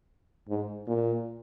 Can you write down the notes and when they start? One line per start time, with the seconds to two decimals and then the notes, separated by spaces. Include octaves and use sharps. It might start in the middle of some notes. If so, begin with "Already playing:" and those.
0.49 G#2
0.87 A#2